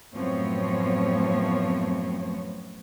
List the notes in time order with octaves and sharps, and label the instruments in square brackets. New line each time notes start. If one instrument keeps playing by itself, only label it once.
[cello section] F#2 A2 F3 B3 C4 C#5